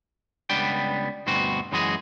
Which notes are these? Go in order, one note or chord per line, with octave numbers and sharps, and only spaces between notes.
C#2 G3 B3 D4 G5
D2 G2 B2 C4 F#4
F#2 E3 G#3 F#4 G#4